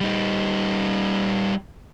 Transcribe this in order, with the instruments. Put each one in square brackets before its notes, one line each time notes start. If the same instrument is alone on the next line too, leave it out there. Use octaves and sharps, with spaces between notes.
[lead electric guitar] G3 D#4